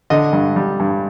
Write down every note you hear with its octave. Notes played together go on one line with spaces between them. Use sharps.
D3 D#5
G2
G3
G2